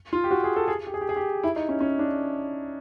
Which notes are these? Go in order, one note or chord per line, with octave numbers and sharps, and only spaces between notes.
F4
G4
F#4
G#4
A4
G#4
G4
G#4
G4
G#4
G4
E4
D#4
C#4
C#4
D4